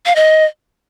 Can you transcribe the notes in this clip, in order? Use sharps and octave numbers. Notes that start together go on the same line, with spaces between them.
F5
D#5